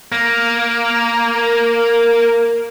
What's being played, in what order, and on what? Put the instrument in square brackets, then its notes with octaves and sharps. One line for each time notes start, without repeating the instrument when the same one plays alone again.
[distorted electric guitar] A#3
[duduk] A#4